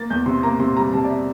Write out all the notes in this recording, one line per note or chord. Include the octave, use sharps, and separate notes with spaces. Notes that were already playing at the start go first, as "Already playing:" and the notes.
Already playing: A#3 A6
E2 G6
C3 C6
A#3 A#5
C3 C6
G3 A#5
C3 A5
D5
E5